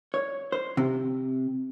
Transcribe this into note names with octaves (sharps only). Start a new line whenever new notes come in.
C#5
C5
C3